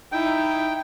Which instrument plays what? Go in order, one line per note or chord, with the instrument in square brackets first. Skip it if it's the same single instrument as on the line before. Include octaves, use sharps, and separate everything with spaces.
[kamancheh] D#4 E4 [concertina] G5